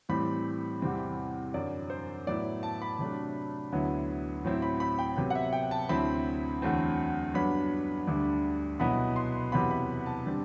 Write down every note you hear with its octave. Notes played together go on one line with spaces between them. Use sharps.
A2 E3 G3 C4 B5
E2 C3 E3 G3 C4
F#2 D3 F#3 D5
C5
A2 F#3 B3 E4 D5
A5
B5
C3 F#3 A3 D4
D2 D3 F#3 B3 E4
A2 F#3 C4 E4
B5
B5
G5
C3 F#3 B3
F#5
E5
G5
A5
D2 D3 F#3 C4 E4 B5
E2 D3 F#3 A3 C4
G2 F#3 B3 D4 B5
D2 D3 G3 D4
C2 B2 F#3 B3 E4 B5
C6
E2 C3 F#3 B3 E4 B5
B5
A5
D3 G3 C4